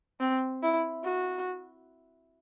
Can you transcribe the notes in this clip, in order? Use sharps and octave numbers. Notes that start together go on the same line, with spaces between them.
C4
E4
F#4